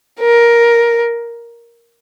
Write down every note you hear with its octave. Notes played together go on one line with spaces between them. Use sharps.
A#4